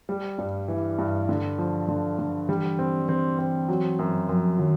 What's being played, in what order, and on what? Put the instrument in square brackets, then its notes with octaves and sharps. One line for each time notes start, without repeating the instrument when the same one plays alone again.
[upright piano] G3
G2
E3
G2
D3
F3
D3
D3
[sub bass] E3 [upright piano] G3
[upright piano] C4
[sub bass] E3 [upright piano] C4
[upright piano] C4
F#3
F#2
[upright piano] F#2 [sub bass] F3
[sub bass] D#3 [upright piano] F#3